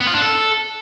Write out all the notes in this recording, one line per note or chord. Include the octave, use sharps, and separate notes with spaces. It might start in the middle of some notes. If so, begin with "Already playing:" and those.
B3
F4
D4
A4